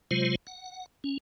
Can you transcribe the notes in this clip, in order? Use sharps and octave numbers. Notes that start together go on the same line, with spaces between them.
C3 F#3 G#3 F4 C5
F#5
C#4